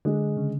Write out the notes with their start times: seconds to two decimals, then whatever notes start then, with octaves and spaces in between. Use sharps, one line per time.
0.05 D3 G#3
0.37 C#3